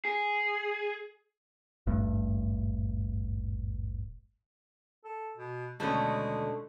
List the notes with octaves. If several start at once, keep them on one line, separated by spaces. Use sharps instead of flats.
G#4
D#1 G#1 G2 A3
A4
B2
D#2 B2 D3 G#3 A3 C#4 C#5